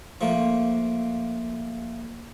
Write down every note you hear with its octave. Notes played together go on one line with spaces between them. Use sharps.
F3 A3 A#3